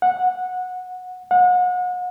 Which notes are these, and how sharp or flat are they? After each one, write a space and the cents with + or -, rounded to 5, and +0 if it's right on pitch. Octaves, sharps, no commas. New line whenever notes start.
F#5 -15
F#5 -35